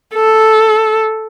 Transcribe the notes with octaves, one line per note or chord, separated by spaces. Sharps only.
A4